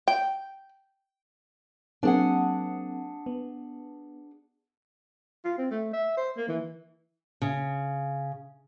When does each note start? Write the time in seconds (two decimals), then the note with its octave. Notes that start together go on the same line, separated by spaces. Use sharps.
0.08 G5
2.03 F#3 A#3 C4 D4 G#4 F#5
3.26 B3
5.45 F4
5.58 C4
5.71 A3
5.93 E5
6.17 C5
6.37 A#3
6.49 E3
7.42 C#3